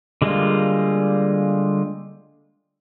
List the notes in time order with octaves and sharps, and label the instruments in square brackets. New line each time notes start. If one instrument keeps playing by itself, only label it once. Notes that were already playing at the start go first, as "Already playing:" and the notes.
[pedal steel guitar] D3 G3 G#3 A#3 F4